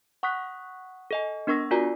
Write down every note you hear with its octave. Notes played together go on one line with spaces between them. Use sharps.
F#5 C#6 D#6 F#6 B6
A4 D#5 G#5
B3 D4 A#4 C#6 E6 A#6
F4 F#4 A#4 D5 G#5 A#5